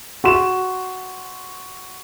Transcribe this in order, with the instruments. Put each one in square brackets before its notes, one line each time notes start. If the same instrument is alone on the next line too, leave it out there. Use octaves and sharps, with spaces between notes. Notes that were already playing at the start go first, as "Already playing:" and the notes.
[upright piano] F#4 C6 E7